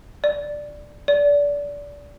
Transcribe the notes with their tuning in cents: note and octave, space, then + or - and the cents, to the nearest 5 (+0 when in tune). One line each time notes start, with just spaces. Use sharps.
D5 +5
D5 -25